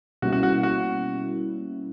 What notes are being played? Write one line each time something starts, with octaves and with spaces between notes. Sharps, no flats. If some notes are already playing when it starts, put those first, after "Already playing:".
B2 G3 A#3 C#4 E4 F#4
F#4
F#4
F#4